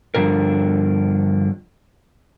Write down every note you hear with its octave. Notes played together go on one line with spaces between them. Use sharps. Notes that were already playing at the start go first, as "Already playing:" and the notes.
G2 D3 D#3 F3 A#4